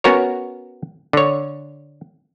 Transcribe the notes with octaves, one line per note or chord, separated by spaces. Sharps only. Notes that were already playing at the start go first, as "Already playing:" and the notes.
B3 C#4 F#4 A#4 C#5
D3 C#5